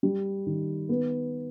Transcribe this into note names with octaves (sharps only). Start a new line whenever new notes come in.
G3
D#3
B3